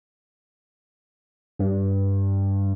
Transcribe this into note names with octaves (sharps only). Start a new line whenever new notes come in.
G2